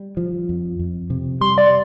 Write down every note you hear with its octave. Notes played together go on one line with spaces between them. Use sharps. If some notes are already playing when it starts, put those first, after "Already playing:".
Already playing: G3
F3
F2
F2
C3
G3 C6
D5